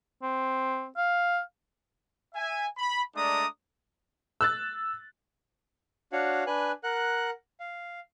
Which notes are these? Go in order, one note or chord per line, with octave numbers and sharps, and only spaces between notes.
C4
F5
E5 G#5
B5
G#3 A3 D4 D5 A#5 D#6
E6 F#6 A6
D4 F#4 C#5 F5 F#5
D4 B4 G#5 F#6
A#4 F#5 F#6
F5